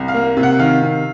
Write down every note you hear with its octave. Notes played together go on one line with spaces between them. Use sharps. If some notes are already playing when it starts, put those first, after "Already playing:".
Already playing: C2
F5
A#3
C3
F#5
D#3 F5
C3